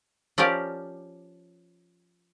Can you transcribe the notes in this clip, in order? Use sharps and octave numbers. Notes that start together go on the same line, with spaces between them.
F3 C#4 G4 A#4 D5